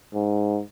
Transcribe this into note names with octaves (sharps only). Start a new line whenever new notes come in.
G#2